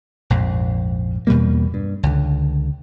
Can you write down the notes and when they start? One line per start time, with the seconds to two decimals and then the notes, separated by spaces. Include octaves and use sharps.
0.30 A#1 F2 G#2
1.27 E2 B2 G3 A#3
1.74 G2
2.03 C#2 D3